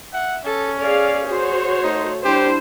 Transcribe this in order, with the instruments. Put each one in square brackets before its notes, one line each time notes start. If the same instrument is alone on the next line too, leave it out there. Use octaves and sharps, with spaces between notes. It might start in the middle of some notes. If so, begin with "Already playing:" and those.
[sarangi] E5 [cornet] F#5
[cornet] C#4 [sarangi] A4
[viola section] G#4 F5 [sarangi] D5
[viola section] F#4 C5 C#5 [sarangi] G#4
[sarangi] A3 [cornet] D#4
[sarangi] G3 [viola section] D4 E4 C5 [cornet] G4